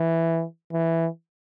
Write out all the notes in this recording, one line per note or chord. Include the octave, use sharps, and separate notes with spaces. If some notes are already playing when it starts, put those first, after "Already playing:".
Already playing: E3
E3